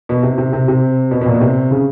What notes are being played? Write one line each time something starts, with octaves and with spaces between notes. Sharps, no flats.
B2
C3
C3
C3
C3
B2
B2
A#2
B2
C3
C#3